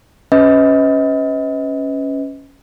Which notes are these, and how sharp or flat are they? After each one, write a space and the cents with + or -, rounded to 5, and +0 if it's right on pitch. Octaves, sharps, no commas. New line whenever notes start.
C#4 +0 B4 +25 D#5 +35